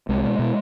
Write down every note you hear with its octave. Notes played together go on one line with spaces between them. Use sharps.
C2 G#3
B2
B2